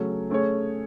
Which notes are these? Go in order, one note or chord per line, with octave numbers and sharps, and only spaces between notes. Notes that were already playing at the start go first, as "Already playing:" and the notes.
Already playing: C#3 F#3 A3 C#4
A3 C#4 G#4 C#5